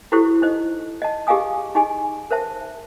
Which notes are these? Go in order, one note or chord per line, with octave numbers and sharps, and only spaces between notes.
E4 F#4 G4 A4 C5 C#6
D#4 C5 D#5
D#5 A5
G4 G#4 D#5 F5 G#5 D#6
D#4 G4 G#4 D#5 G#5
A#4 C5 E5 A5